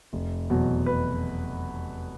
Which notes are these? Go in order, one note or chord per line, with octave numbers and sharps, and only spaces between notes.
F1
E2 B2 F#3
B4